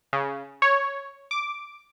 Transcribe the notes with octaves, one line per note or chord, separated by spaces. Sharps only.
C#3
C#5
D6